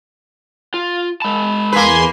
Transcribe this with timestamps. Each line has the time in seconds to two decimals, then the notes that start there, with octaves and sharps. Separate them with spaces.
0.74 F4
1.22 G#3 A5 B5
1.73 E2 A#3 B4 G#5 C6